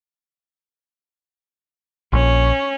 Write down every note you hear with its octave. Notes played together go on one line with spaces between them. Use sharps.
A#1 C#4